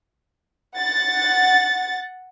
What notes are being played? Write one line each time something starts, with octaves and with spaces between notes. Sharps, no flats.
F#5 A6